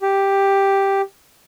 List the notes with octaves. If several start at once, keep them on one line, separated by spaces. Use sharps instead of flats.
G4